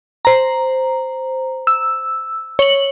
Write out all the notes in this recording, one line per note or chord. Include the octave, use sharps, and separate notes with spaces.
C5 A#5
E6
C#5 F#7